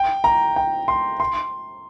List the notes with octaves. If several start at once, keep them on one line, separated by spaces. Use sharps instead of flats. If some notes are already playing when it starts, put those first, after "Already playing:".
Already playing: G5
A#5
G5
C6
C6